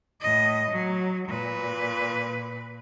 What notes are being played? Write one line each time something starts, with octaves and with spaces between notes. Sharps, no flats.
A2 D#5
F#3
A#2 B4